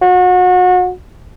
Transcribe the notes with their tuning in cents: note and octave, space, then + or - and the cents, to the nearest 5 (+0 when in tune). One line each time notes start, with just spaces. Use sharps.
F#4 -30